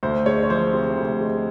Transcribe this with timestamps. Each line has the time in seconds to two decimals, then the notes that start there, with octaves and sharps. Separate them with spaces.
0.03 D2 C5
0.26 G#3 C#5
0.43 C#5
0.50 F3 C5
0.73 C3
0.96 D2
1.21 G#3